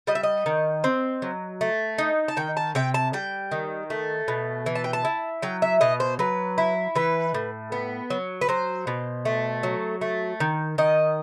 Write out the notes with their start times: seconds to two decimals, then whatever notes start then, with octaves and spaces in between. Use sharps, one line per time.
0.07 G3 D#5
0.15 E5
0.23 D#5
0.46 D#3
0.84 C4
1.22 F#3
1.61 A3
1.98 D#4
2.28 A5
2.37 D#3 G5
2.57 A5
2.75 C3 G5
2.94 A5
3.13 G3 G5
3.52 D#3
3.90 A3
4.28 B2
4.66 E3
4.75 A5
4.84 G5
4.93 A5
5.05 E4
5.42 F#3 G5
5.62 E5
5.81 B2 D#5
6.00 C5
6.19 F#3 B4
6.58 E4
6.95 E3 B4
7.34 A2
7.72 B3
8.10 F#3
8.41 B4
8.49 F#3 C5
8.87 B2
9.25 A3
9.63 F#3
10.01 A3
10.40 D#3
10.78 D#3 D#5